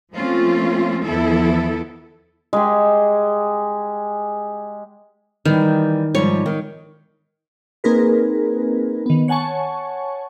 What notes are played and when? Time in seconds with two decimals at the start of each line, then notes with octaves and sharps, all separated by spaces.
0.13 F3 A3 A#3 C4 C#4 F4
1.03 E2 D#3 F3 B3 E4 A4
2.53 G#3 G4
5.45 D#3 E3 G3
6.15 G#2 F3 G3 C#5
6.46 D#3
7.84 A#3 C4 D#4 G#4 A#4 B4
9.06 D#3 B3
9.28 C#5 F#5 G#5 A5 C#6